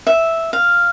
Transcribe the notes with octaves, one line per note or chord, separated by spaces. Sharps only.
E5
F5